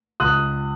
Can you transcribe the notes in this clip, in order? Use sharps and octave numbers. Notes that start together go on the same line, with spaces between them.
C#2 D#6 F#6